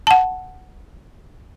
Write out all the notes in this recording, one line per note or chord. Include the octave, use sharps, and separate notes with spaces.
F#5 A5